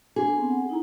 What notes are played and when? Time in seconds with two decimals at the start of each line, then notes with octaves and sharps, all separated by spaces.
0.16 D4 G#4
0.35 B3 C4
0.50 F#5
0.69 D#4 E4 A#5